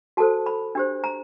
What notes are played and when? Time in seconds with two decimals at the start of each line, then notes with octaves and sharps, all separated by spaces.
0.17 F#4 A4 C5 A5
0.46 B5
0.75 D4 G4 C5
1.04 A#5